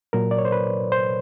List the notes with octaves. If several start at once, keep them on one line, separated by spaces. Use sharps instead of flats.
A#2 F#3 A#4
D5
C#5
C5
B4
C5